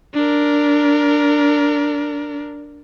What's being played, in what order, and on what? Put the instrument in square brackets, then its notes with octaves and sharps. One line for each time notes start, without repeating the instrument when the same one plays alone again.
[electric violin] D4 A#4